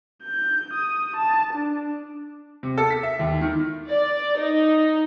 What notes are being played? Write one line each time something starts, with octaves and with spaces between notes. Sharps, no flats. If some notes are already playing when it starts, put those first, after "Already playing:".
G6
D#6
A5
D4
C3
A4
B6
E5
D#2
D#3
D5
D#4